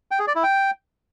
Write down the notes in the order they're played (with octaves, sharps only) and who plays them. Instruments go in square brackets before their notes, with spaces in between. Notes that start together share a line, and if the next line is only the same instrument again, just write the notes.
[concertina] G5
G#4
D5
E4
G5